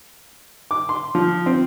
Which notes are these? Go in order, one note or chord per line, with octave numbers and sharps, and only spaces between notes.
D6
C6
F3
C4